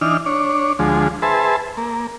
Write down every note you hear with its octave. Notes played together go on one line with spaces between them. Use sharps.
E3 D4 D#4 F6
D4 C#5
D2 F3 G#3
G#4 B4 C5 E5 A5
A#3